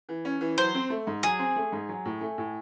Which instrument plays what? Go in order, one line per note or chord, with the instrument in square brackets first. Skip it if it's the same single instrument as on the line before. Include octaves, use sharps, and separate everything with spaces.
[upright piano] E3
C#4
E3
[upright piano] F#3 [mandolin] C5
[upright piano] C4
A3
G#2
[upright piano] F#3 [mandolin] G#4
[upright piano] C4
A3
G#2
F#3
A2
A3
A2